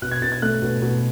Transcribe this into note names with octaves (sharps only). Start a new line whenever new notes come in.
B2 F#6
G#6
B2 A6
G#6
A3 F#6
B2
B2